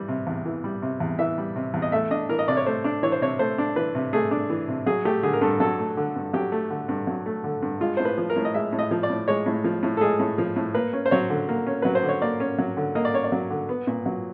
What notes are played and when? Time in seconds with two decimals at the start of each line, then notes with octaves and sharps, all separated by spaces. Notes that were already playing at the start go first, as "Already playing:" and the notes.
Already playing: E3 G3
0.08 C3
0.27 E2
0.46 E3
0.64 G3
0.82 C3
1.00 E2
1.19 E3 E5
1.38 G3
1.56 C3
1.74 E2
1.82 D#5
1.92 A3 E5
2.11 D4 D#5
2.29 E3 A#4
2.39 D#5
2.48 C3 D5
2.57 C#5
2.66 A3 C5
2.84 D4
3.03 E3 C#5
3.12 C5
3.21 C3 C#5
3.39 A3 C5
3.58 D4
3.76 E3 B4
3.95 C3
4.13 A3 G#4
4.31 D4
4.50 E3
4.68 C3
4.86 F#3 G#4
5.05 A3 G4
5.23 D3 G#4
5.33 A#4
5.41 G2 A4
5.60 F#3 A4
5.79 A3
5.97 D3
6.16 G2
6.33 F#3 G4
6.52 A3
6.70 D3
6.89 G2
7.07 F#3
7.26 A3
7.44 D3
7.62 G2
7.81 G#3 F4
7.97 A2 C5
8.05 B4
8.18 F3
8.30 A#4
8.36 A2
8.45 D#5
8.54 G#3 E5
8.73 A2
8.79 D#5
8.91 F3
9.03 D5
9.10 A2
9.28 G#3 C#5
9.46 A2
9.64 F3
9.83 A2
9.97 A4
10.01 G#3 G#4
10.20 A2
10.38 F3
10.56 A2
10.75 A#3 B4
10.93 C#4
11.06 C5
11.11 F#3 C#5
11.30 D3
11.49 A#3
11.67 C#4
11.82 F#3 B4
11.95 C5
12.03 D3
12.09 C#5
12.22 A#3 D5
12.40 C#4
12.58 F#3
12.77 D3
12.95 A#3 D#5
13.05 D5
13.13 C#4 C#5
13.24 D5
13.32 F#3
13.51 D3
13.69 B3
13.87 A#2
14.06 F#3